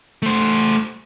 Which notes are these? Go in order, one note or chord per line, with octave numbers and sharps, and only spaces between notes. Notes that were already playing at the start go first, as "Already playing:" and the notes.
A3 C5